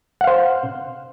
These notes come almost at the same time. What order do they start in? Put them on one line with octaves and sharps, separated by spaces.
F#5 F5 C5